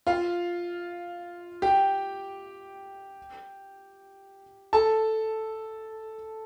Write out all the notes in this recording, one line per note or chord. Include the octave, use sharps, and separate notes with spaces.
F4 F5
G4 G5
A4 A5